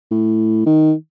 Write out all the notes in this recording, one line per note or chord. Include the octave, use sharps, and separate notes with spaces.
A2
D#3